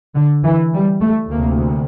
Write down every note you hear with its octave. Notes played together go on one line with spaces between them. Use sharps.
D3
E3
G3
A3
D2 C3 A#3